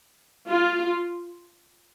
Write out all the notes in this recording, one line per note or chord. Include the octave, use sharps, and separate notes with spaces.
F4